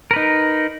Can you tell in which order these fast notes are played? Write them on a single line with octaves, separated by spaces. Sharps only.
A#4 B4 D#4